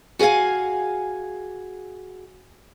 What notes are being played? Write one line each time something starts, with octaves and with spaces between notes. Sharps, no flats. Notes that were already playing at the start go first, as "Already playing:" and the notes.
F#4 G#4 D5 F5 G#5